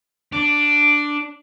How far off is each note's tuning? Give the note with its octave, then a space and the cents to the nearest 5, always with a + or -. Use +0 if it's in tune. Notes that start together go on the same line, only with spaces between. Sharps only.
D4 +0